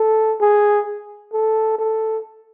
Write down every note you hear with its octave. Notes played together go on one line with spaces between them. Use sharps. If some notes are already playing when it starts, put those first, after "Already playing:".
Already playing: A4
G#4
A4
A4